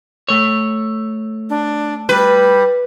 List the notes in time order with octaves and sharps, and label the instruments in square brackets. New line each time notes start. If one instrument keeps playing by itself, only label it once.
[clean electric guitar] A3 C#5
[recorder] D4
[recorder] G3 [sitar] B4